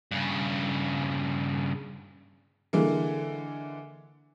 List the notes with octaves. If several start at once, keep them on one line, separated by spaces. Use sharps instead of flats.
G2 C#3
D3 E3 G#3 A#3